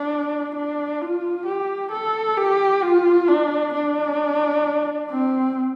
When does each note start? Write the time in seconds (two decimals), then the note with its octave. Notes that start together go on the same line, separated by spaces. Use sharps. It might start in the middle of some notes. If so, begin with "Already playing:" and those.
Already playing: D4
0.55 D4
1.01 F4
1.47 G4
1.92 A4
2.37 G4
2.83 F4
3.28 D4
3.74 D4
5.10 C4